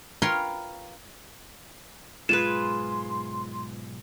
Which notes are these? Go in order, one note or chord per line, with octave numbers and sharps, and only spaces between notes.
F4 A#4 B4 C#5 G5 C6
B1 G#2 G#3 F4 G#4 B4 C6 E7